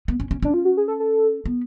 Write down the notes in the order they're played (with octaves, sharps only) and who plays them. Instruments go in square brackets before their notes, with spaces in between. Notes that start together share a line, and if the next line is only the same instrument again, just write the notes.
[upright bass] B3
C#4
C#4
[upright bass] C#4 [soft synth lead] D4
[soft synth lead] F4
F#4
G#4
A4
A4
[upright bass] B3